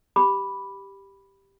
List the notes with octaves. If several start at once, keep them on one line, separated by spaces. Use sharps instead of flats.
G4 B5 D6